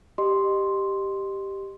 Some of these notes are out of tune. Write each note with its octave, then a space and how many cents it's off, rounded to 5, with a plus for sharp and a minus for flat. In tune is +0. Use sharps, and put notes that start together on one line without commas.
G4 +0 D#5 -25 C6 +0